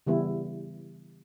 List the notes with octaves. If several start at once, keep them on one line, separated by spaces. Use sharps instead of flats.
C#3 E3 G3 B3 E4